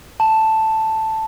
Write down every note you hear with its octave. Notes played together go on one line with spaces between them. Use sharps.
A5